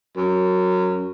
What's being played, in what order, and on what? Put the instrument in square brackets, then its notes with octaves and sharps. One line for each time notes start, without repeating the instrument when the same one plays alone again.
[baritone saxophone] F#2